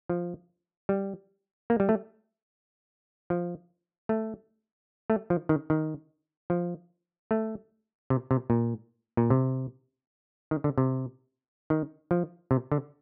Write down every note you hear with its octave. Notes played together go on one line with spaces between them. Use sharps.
F3
G3
A#3
G3
A3
F3
A3
A3
F3
D#3
D#3
F3
A3
C3
C3
A#2
A#2
C3
D#3
D3
C3
D#3
F3
C3
D3